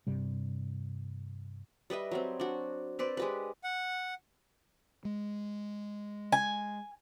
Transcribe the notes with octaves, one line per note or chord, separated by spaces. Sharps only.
G2 C3 G3
G3 B4 D#5 E5
F#3 G3 C4
D4 F#4
C4 B4 C5 D5
G#3 G4 B4
F#5
G#3
G#5